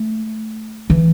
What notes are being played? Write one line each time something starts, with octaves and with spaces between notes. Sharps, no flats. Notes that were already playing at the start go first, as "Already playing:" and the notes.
Already playing: A3
E3